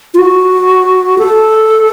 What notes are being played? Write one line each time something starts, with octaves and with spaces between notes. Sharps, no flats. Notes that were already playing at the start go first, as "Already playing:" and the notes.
F4
F#4
A4